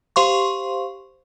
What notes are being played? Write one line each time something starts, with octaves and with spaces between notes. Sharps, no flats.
G4 C5 F5 C6 C#6